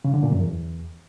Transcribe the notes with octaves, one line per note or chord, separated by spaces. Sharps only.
C#3
D3
A#2
F#2
E2